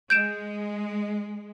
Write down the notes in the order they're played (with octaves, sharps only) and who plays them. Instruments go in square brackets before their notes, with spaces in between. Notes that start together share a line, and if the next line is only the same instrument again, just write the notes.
[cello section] G#3 [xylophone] G6 D7 E7